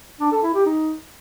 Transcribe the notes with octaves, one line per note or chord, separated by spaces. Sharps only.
D4
A4
E4
G4
D#4